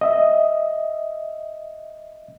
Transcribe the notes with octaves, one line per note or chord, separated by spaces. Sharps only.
D#5 E5